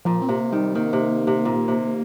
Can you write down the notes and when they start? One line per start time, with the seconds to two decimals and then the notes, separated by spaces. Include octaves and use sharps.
0.05 A#2 F3
0.22 C4
0.29 C3 A#3
0.52 D#3 G3
0.75 D#3 A#3
0.93 C3
1.27 C3
1.45 A#2
1.68 C3